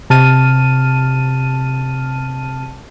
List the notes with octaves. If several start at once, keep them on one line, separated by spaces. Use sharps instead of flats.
C3 A5 F6 D#7